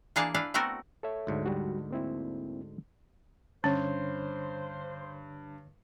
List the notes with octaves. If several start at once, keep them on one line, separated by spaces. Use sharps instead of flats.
E3 A#3 D4 G#4 F5 A5
D4 E4 B4 F5
A3 B3 C4 F#4 A4 A#4
A4 C#5 E5
D2 G#2 D3
G3 F#4
A#3 C4 E4
G2 D3 C#4 C5 C#5